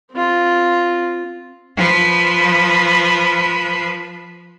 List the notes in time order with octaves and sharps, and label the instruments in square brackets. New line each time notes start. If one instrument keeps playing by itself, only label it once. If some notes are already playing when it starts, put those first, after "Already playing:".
[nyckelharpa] C4 F4
[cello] F3 B4